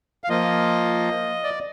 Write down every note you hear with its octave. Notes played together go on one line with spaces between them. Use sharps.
F5
F3 A#3 F4 D#5
D5